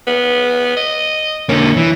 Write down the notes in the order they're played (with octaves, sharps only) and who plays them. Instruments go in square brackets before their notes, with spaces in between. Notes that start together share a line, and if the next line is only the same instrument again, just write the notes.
[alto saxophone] B3
D#5
[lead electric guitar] D3 A#3 [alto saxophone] C#4
[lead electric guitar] E3